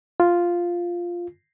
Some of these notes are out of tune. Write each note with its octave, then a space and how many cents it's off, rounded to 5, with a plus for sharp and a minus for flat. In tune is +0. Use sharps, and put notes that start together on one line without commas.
F4 +0